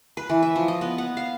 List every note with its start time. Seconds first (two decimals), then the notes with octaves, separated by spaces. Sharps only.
0.17 B4
0.29 E3
0.42 E5
0.56 F3
0.68 D#5
0.81 B3
0.98 F#5
1.17 F5